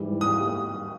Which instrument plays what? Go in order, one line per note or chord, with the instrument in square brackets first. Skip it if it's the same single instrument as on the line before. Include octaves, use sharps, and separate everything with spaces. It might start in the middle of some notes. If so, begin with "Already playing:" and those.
Already playing: [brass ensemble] G#2 E3 G3
[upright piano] D#6